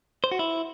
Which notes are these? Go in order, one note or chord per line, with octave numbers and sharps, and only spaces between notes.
C5
F#4
E4